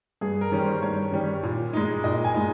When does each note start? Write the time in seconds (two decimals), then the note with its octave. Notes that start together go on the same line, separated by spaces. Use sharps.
0.21 G2 G#4
0.41 A#4
0.52 D#3 G3 C#4
0.62 C5
0.82 G2 C#5
1.13 D#3 G3 C#4
1.43 A#2
1.73 G#3 D#4
2.04 A#2 D#5
2.24 G#5
2.34 G#3 D#4